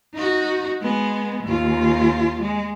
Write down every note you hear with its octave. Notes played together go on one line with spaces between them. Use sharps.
D#4 F#4
G#3 B3
D#2 F4
G#3